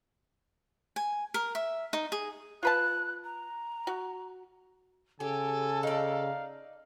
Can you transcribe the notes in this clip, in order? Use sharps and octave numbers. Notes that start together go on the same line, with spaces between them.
G#5
A#4
E5
D#4
G#4
F4 B4 A5 F#6
A#5
F#4
C#3 G4 A4 G#5
D#4 D5 F5